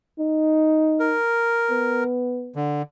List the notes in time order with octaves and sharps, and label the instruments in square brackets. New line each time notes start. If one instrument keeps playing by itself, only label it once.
[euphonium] D#4
[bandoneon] A#4
[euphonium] B3
[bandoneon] D3